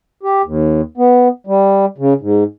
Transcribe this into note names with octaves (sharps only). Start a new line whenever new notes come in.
G4
D#2
B3
G3
C#3
G#2